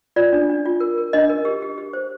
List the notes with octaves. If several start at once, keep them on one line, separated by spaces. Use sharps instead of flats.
F4 D5
D4
D4
F4
A#4
A#4
D4 D#5
A#4
G4
G4
G4
C5